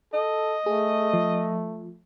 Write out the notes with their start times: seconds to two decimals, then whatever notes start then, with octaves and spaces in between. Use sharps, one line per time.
0.14 A4 D#5
0.66 A3 G#4
1.13 F3